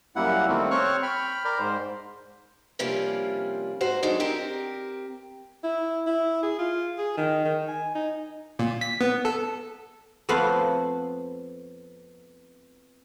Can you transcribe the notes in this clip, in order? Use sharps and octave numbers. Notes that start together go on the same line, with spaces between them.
F#2 G3 A#3 E4 F#5
D#3 G3 A3 A#3 C4
C4 C5 C#5 C#6 F6 F#6
G5 B5 F6
A#4 D5 B5 F6 G6
G#2 C5
C3 F3 G3 A#3 C#4 D4
G#2 F#4 C5
F#3 G#3 D4 D#4 A4
C4 G4 A#4
E4
E4
G#4
F4
G#4
D#3
D#3
G#5
D#4
A#2
B6
B3
A4
F2 A3 B3 C5 F5 B5